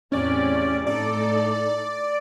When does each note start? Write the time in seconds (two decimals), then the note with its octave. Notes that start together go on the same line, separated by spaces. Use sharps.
0.12 E2 A2 C3 C#4 D5
0.87 A2 D#4 A4 D5